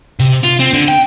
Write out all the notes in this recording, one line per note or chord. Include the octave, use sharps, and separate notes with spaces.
C3
F4
C4
D3
G5